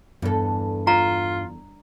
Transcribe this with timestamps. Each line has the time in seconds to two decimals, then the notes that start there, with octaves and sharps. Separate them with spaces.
0.22 E2 G2 A4
0.87 F4 A#5